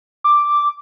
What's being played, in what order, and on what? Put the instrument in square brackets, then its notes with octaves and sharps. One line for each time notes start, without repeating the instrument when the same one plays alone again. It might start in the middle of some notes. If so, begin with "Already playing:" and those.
[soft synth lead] D6